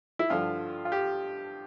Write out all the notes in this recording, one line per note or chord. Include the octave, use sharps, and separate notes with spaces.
E4
G2 D3 F3 F4
F4
G4